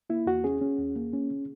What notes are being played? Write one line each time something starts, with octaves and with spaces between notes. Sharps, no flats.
A#3 E4
E2 F#4
C#4 G#4
C#4
E2
A#3
C#4